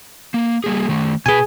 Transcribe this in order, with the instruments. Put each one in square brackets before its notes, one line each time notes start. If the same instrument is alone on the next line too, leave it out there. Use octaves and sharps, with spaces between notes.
[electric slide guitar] A#3
G3 A#3 G#4
D#3 A3
[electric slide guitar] B2 B4 [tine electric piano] G#4 G#5